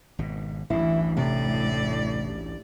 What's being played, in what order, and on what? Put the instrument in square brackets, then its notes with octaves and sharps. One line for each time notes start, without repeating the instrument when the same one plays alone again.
[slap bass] G#1 B2
[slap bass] A1 D2 G2 [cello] E3 [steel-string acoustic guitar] E4
[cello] A2 D5 [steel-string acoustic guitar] C3